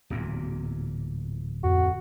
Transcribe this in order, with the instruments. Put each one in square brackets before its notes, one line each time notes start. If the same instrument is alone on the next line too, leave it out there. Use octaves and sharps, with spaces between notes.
[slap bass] D1 E2 A#2
[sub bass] F2 [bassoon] F#4